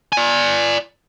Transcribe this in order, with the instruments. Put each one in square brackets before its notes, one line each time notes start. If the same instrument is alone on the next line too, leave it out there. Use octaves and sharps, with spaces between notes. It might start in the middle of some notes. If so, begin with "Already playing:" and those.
[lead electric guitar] D5 G#5